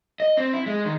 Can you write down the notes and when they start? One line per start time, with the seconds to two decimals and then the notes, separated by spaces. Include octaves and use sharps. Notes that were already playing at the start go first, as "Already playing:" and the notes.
0.20 D#5
0.37 C4
0.53 E4
0.66 G#3
0.85 D#3